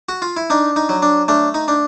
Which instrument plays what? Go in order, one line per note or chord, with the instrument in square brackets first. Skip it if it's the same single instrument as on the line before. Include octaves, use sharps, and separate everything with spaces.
[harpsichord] F#4
F4
E4
D4 D#4
D#4
F#3
D4
A3 D4
D#4
D4